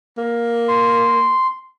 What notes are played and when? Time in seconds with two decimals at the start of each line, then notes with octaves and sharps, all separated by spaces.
0.17 A#3
0.68 C6